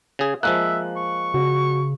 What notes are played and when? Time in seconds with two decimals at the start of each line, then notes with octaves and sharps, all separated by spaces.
0.19 C#3 G#4
0.43 F3 G#3 A#3 E5 F#6
0.96 C#6
1.34 C#3 F#4